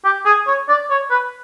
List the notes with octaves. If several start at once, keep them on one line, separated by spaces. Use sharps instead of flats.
G4
G#4
C#5
D5
C#5
B4